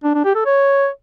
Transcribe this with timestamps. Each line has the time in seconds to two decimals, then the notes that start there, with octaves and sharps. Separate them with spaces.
0.04 D4
0.14 D4
0.25 G4
0.35 A4
0.46 C#5